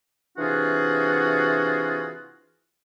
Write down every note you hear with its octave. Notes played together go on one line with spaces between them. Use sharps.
C3 E3 D4 F4 F#4 G#4